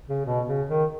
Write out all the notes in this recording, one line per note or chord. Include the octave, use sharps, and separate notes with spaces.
C#3
B2
C#3
D#3